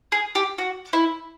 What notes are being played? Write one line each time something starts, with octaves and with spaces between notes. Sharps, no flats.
G#4
G4
F#4
E4